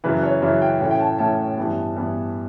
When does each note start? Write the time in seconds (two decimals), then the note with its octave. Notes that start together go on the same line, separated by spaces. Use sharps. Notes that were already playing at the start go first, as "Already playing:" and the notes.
0.04 F#2 C#3 E3 B4
0.23 C#5
0.42 F#2 C#3 E3 E5
0.62 G5
0.80 A2 E3 A3 C#4 G5
0.91 G5
1.01 A5
1.19 A2 E3 A3 C#4 A5
1.58 G2 E3 B3
1.96 G2 E3 B3